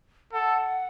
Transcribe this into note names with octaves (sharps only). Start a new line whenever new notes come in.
A4 F#5